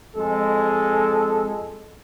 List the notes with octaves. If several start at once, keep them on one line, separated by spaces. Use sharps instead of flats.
F2 G#3 A4